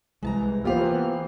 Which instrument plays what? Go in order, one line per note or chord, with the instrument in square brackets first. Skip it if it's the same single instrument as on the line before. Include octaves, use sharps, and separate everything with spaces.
[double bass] C2 [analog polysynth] E3 [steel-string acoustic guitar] G#3 A5 A#5
[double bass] E3 [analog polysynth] A#3 B3 [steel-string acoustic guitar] F4 G#4 F5 [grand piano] G4 C5